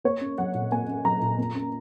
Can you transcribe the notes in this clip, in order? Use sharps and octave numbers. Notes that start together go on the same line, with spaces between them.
A#3 C#5
C#4
F#3 F#5
A#2
A#3 G#5
C#4
F#3 A#5
A#2
A#3
C#4